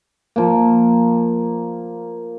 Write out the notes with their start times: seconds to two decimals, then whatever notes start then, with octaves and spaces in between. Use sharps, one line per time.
0.36 F3 A#3